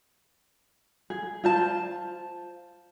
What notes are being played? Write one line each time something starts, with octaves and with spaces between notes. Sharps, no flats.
G#4
F4 C5 A5